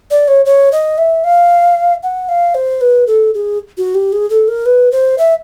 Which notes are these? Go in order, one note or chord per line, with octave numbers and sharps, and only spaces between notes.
D5
C#5
C#5
D#5
E5
F5
F#5
F5
C5
B4
A4
G#4
F#4
G4
G#4
A4
A#4
B4
C5
E5